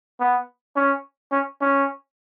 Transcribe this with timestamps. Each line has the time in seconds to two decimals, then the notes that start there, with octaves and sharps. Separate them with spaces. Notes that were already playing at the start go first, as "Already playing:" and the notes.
0.20 B3
0.76 C#4
1.32 C#4
1.61 C#4